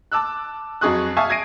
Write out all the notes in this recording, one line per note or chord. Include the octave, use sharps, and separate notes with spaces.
A5 D6 E6 F#6
F2 F#3 G#4 C#6 D#6 F#6
E5 F5 G#5 A5 C#6 D#6
D#6 G#6 A#6 C7 D7 D#7